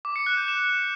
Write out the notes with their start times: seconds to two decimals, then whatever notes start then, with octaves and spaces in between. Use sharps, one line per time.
0.05 D6
0.16 C#7
0.26 F#6
0.37 G6
0.48 E7